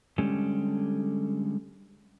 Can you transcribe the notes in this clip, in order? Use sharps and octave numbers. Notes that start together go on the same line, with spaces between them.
D3 G3 G#3 C#4 G4 A4